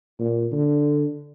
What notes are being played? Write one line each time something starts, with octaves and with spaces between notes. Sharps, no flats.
A#2
D3